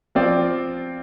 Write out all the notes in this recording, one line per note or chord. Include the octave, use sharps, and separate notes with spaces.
F3 C4 F4 D5